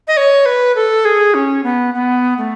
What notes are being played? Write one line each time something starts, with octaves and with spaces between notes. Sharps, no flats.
D#5
C#5
B4
A4
G#4
C#4
B3
B3
A3